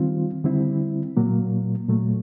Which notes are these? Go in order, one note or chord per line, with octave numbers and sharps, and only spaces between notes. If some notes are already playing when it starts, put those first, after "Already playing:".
Already playing: D#3 G3 C4 F4
D3 G3 C4 E4
A#2 F#3 A#3
A#2 F#3 A3